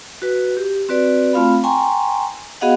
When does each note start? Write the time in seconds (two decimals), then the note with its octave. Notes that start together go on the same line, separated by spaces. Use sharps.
0.22 F#4 B4
0.57 G4
0.89 C4 F#4 B4 D5
1.33 A3 C4 F4 F5 B5
1.63 G5 G#5 A#5 C6 C#6
2.61 B3 F#4 G#4 D#5 F5 F#5